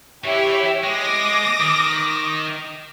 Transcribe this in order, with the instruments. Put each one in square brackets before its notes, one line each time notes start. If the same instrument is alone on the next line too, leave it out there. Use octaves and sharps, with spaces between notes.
[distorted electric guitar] E3 E4 [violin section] G4 C#5 E5
[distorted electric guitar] G#3 [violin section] D6 D#6 A#6
[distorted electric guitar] D#3